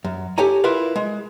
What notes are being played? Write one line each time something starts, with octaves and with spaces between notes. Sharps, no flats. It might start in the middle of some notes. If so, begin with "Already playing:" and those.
F#2
G4 A4 C#5 G#5 A#5
E4 F4 A#4 B4 F5
G#3